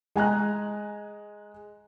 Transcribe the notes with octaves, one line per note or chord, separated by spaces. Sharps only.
G#3 G#5 A#5 F#6